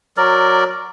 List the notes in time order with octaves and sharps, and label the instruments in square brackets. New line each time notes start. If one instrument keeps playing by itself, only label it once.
[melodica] F#3 A#4 D5